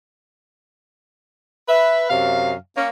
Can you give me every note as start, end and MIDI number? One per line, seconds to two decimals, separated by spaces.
1.69 2.06 71
1.69 2.06 76
2.09 2.52 42
2.09 2.52 48
2.09 2.52 77
2.76 2.90 58
2.76 2.90 61